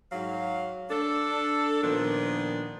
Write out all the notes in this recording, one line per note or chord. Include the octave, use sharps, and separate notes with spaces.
G#2 F#3 F5
D4 A4
A#2 D#3 F3 B3 D4